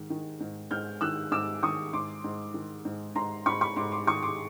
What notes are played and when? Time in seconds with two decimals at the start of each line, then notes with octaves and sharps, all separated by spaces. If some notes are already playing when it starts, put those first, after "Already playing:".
Already playing: G#2 D#3
0.10 D#3
0.40 G#2
0.71 G#2 F6 G6
1.01 D#3 E6 F#6
1.31 G#2 D6 E6
1.63 D#3 C#6 D#6
1.93 G#2 C6 D6
2.24 G#2
2.54 D#3
2.85 G#2
3.15 G#2 A#5 C6
3.46 G#2 B5 C#6
3.61 B5 C#6
3.76 G#2 C6 D6
3.92 C6 D6
4.07 D#3 C#6 D#6
4.22 C6 D6